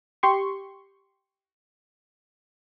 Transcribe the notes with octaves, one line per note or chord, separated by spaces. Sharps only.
G4 C6 C#6